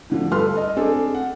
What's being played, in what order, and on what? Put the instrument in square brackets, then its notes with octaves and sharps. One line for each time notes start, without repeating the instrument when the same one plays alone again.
[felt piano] A2 D3 F3
G2 A4 B4 C6 F6
D#5
C4 D4 G#4 A4
F#5